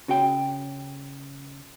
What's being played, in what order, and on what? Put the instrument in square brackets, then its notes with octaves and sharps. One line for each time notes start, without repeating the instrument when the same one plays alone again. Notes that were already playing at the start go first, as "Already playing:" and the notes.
[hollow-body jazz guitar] C#3 F#4 C#5 G5